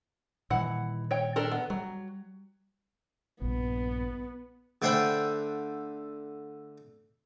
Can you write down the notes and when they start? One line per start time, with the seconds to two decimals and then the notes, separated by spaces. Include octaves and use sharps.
0.50 A#2 D#3 E3 G3 F#5
1.11 C#5 G5
1.36 D4 A4 A#4
1.52 B3
1.70 F#3 G3
3.42 A#1 G2 B3
4.82 D3 A3 C5 F#5 G5 B5